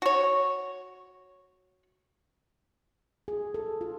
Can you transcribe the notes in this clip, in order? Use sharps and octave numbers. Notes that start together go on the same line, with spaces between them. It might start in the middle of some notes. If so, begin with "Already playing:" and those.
F#4 C#5
G#4
A4
F4